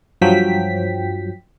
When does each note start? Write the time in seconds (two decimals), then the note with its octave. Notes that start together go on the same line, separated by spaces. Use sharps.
0.21 G2 F3 F#3 G5 B6